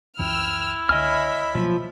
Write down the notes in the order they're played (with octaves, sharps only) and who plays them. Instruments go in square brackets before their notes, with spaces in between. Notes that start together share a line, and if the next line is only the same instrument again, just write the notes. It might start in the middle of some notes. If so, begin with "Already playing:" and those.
[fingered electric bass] C#2 F#2 E3 [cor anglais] E4 [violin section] G5 E6 F6
[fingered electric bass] C#2 D3 [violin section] C#5 E5 B5 [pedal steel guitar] D#5 G#5 F6
[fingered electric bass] B2 F#3 A#3 [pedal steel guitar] F3